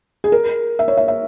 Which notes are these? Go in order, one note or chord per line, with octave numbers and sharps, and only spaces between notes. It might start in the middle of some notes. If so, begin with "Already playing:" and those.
G#4
A#4
E5
C#5
E5
E5